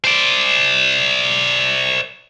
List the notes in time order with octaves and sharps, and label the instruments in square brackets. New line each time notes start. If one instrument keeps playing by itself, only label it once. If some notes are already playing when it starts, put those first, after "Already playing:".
[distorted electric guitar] C5 D5